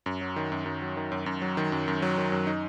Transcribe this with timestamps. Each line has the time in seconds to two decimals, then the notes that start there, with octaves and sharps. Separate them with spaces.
0.06 F#2
0.21 F#3
0.36 D#3
0.52 F#2
0.66 F#2
0.82 F#3
0.97 D#3
1.12 F#2
1.26 F#2
1.42 F#3
1.57 D#3
1.72 F#2
1.88 F#2
2.02 F#3
2.18 D#3
2.32 F#2
2.47 D#4